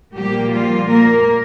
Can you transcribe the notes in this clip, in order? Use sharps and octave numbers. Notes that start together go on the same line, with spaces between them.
A#2 F3 G3 A#3 G4
F3 F4
A#3 A#4